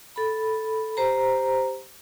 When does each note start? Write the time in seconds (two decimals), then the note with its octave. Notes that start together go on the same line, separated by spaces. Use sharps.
0.16 A4 B5
0.97 G4 C5 A#5